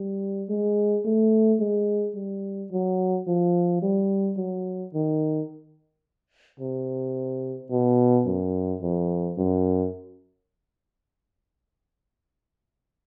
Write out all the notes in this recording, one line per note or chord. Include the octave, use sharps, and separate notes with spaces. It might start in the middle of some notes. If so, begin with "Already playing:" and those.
Already playing: G3
G#3
A3
G#3
G3
F#3
F3
G3
F#3
D#3
C3
B2
F#2
F2
F#2